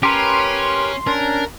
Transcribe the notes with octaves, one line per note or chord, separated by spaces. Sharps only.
C#4 G4 A#4 B4 C6
C#4 D4 A#4